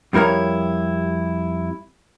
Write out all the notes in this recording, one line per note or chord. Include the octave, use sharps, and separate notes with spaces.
F2 G3 E4 A#4 C#5